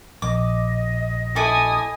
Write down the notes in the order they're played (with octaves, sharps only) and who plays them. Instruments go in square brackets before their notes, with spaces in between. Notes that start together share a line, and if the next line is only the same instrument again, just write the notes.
[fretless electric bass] A#1 [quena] D#5 [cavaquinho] D6
[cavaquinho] E4 A4 D6 [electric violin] G#5 D#6